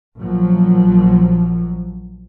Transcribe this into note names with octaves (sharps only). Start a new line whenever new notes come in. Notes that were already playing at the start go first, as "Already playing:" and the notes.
A#1 F3 F#3